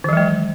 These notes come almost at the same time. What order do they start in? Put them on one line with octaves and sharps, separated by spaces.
D#3 E3 F#3 G#3